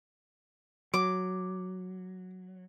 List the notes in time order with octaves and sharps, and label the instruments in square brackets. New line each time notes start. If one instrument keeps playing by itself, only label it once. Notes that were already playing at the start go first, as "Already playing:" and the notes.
[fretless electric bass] F#3 [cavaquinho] D6